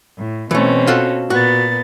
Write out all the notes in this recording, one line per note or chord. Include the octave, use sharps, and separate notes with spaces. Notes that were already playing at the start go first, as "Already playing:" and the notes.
A2
B2 E3 A3 C4 C#4
F4 F#4 A4
A#2 B3 F#4 A6